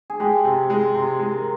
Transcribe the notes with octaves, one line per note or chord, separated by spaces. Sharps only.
G#4
G#3 G4
C3
G#3
C3
G#3
A#4